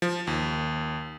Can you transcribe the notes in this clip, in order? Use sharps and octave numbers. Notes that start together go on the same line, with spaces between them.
F3
D#2